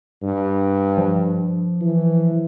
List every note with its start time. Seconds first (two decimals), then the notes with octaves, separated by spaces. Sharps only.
0.23 G2
0.98 F3
1.81 E3